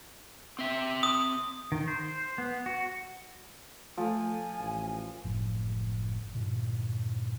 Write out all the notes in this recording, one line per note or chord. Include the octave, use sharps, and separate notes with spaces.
C4 E5
D#6
D#3
C5
B3
F#4
F3 A3 G#5
A1
F#1 A2 F3
G2 A#2 D3